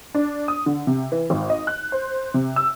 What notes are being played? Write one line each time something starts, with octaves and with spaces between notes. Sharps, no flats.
D4
D#6
D3
C3
E3
G#1
D#5
F#6
C5
C3
E6